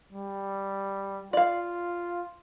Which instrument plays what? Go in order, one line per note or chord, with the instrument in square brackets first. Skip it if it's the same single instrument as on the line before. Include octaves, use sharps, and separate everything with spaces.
[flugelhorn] G3
[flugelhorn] F4 [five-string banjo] D5 F5